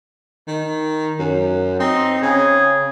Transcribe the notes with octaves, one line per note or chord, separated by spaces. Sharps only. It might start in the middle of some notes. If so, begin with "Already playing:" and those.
D#3
F#2
C4 D#4
C#3 G#4